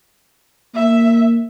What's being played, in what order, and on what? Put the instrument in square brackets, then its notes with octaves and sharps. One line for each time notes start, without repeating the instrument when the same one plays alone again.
[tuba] A#3 [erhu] E5